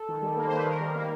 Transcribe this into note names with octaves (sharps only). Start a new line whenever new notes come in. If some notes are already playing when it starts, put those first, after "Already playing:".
Already playing: A4
D#3
G3
A#3
C5
D#3 B4
D#3 A#4
G3
A#3